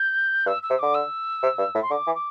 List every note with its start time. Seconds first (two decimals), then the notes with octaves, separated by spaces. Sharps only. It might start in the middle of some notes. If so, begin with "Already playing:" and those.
Already playing: G6
0.46 G2 E6
0.62 E6
0.70 C3
0.79 D3 D6
0.94 E6
1.43 C3
1.58 G2
1.75 A2
1.82 C6
1.91 D3 D6
2.07 E3
2.15 D6